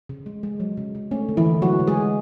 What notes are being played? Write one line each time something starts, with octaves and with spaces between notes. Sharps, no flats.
C#3
G#3
G#3
F#3
C#3
C#3
A3 C#4
D3
E3 E4
D3
F#3 G#3 F#4
C#3
G#3 G#4
C#3